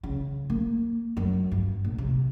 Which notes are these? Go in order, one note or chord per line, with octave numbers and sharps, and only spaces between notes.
C#3
A#3
F#2
G2
A#1
C3